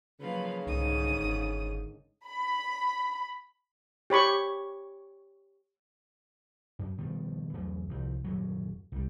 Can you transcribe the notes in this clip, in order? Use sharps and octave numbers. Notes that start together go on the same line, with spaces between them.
C#3 F3 F#3 A#3 B4 F5
C2 G#2 D3 D#3 D#6
G1
B5
G4 C#5 B5 C#6
F#2
B2 D#3 F3 G3
E2 E3 F#3 A3
C2 F3
D#1 F#2 F#3
C2 G3